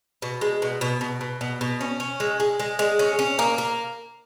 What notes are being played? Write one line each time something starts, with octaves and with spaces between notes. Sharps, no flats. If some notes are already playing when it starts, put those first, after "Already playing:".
B2
G#3
B2
B2
B2
B2
B2
B2
C#4
C#4
G#3
G#3
G#3
G#3
C#4
C#4
A#3
A#3